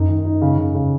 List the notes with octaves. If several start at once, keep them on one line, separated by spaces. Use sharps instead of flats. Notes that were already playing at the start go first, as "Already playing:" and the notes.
Already playing: F#2 D#4
D#3
D#4
C#3
C#3
C#3